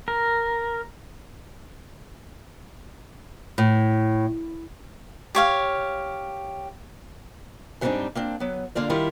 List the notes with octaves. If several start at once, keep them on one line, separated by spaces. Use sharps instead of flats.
A#4
A2
G4 C#5 F5
G#2 F#3 G3 C4 D4 D#4
A#3 C4 D4
F#3 B3
D3 A#3 F4 D5
D#3 G3 E4 F4